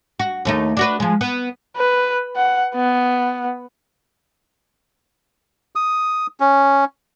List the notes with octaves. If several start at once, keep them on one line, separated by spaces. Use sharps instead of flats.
F#4
D#2 A3 D#4
D4 F#4 B4
F3 G#3
B3
B4
F#5
B3
D#6
C#4